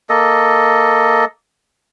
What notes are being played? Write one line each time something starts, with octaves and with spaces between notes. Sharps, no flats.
A#3 A4 D#5